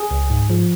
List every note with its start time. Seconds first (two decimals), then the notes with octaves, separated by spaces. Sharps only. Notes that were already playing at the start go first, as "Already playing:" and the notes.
Already playing: G#4
0.11 C#2
0.30 G#2
0.50 F3